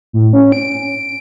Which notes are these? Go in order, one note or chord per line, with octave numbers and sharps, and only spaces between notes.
A2
C#4
D7